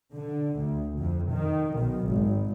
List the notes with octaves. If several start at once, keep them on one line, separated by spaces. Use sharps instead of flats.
D3
D2
F2
D#3
B1
G#1